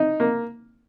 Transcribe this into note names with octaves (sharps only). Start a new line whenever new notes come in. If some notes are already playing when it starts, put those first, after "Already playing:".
Already playing: D#4
A#3